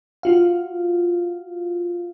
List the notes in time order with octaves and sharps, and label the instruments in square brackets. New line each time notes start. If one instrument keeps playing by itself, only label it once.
[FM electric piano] F4 F#4 F5